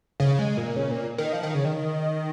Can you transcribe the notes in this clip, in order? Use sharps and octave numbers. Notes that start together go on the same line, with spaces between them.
C#3
G#3
A#2
C#3
A#2
D#3
F3
D#3
C#3
D#3